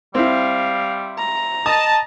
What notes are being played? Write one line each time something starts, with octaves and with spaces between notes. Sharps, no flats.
G3 C4 E4 F5
A#5
D#5 A5 D#6